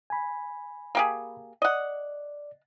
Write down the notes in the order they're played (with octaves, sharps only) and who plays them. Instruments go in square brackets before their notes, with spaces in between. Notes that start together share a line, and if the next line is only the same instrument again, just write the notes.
[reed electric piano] G#5 B5
[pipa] A#3 G4 G#4
[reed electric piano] D5 [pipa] D#5 F#5